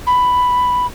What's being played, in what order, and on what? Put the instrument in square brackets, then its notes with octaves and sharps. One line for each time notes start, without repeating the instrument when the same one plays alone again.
[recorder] B5